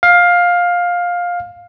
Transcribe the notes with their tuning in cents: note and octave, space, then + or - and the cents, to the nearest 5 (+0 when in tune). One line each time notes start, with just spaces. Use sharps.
F5 +15